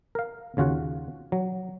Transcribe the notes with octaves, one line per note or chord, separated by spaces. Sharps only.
A#4 F5
D#2 C#3 F4 F#4 F#5
F#3